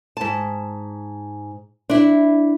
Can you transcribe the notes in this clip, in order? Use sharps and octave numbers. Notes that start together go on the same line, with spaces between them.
G#2 A5
D4 E4